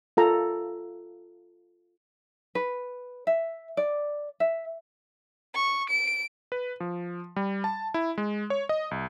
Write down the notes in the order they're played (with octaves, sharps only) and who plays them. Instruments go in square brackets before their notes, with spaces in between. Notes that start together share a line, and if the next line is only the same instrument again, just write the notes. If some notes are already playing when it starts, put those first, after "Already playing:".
[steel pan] F4 A4 A#5
[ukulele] B4
E5
D5
E5
[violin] C#6
D7
[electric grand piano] B4
F3
G3
A5
E4
G#3
C#5
D#5
C2